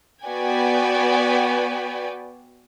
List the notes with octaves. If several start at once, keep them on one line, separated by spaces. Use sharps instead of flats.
B3 F#4 B4 D5 G5 G#5